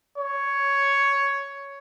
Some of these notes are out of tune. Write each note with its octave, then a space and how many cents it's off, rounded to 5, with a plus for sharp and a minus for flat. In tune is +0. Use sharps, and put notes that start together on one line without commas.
C#5 +5